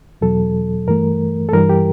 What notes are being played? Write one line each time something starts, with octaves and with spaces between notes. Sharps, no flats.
E2 B2 F#3 A4
G2 E3 A3 A#4
A4
G2 E3 G3 A#4
G4